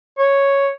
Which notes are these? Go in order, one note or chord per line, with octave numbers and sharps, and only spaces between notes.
C#5